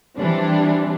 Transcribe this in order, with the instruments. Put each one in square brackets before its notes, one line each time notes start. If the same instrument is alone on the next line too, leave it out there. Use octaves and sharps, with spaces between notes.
[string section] E3 G3 C4 D4